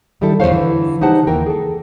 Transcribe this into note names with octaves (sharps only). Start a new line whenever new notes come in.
D#3 G3 D4 E4 A4
E2 B2 B3 C5 C#5 F5
D3 E3
C#3 D#4 G4 C5 F#5 A5
D#2 E3 A#3 A#4 G5
G#4 A4